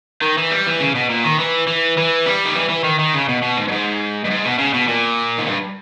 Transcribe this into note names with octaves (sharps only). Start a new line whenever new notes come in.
D#3
E3
G3
E3
C#3
B2
A#2
D#3
E3
E3
E3
G3
D#3
E3
E3
D#3
D#3
C#3
B2
B2
G#2
G2
G#2
G2
G#2
B2
C#3
B2
A#2
G#2
G2